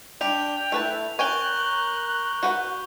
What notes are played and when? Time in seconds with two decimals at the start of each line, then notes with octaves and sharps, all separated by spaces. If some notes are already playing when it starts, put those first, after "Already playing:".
0.21 G3 D4 G4 G5 F7
0.72 A3 E4 B4 A5
1.19 C#4 A#4 G5 G#5 C#6 F#6 G6 G7
2.43 F#4 B4 F#5